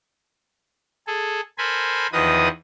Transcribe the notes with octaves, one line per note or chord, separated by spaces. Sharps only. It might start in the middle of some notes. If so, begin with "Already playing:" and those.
G#4 A4
A4 A#4 C5 G#5 B5
E2 D#3 F3 B4 D#5 D#6